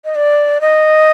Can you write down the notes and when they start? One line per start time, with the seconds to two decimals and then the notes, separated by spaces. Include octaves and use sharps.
0.05 D#5
0.15 D5
0.61 D#5